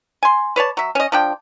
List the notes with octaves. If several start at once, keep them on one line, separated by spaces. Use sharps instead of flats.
G#5 C6
B4 C#5 D5 A5
F#3 E5
C#4 D#5
F3 D4 G5